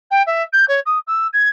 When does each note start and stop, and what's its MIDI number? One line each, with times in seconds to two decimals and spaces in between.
0.11 0.22 79
0.26 0.43 76
0.53 0.65 91
0.68 0.80 73
0.86 0.99 87
1.07 1.27 88
1.33 1.49 92